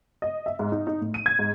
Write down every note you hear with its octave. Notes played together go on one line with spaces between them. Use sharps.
D#5
E5
G#2
D#4
D#4
A2
D#7
G#6
G#2